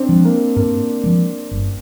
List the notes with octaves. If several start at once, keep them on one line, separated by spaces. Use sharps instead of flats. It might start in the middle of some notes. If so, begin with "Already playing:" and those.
Already playing: C4 D4
F3 G#3
A#3
G#2 A#3
F3 G#3
G1